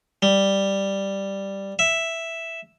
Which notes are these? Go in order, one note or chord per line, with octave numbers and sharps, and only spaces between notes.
G3
E5